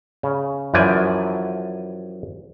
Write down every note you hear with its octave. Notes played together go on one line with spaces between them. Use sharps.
C#3
F#2 E3 F3 D5 G#5